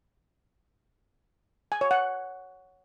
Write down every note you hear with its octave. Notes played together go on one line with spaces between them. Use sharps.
G#5
C#5
F#5